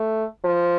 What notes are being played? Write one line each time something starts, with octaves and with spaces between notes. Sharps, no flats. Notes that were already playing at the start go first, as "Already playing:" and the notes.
Already playing: A3
F3